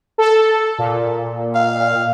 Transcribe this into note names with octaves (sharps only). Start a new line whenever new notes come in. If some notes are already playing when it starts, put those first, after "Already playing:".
A4
A#2
F5